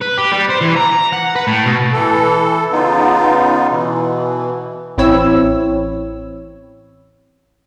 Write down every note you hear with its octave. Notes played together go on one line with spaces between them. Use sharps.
B4
G4
G3
C5
E3
A#5
F#5
B4
A2
B2
E3 A4
C#3 B3 D#4 F4
B2 E3
A1 C4 E4 C#5 E6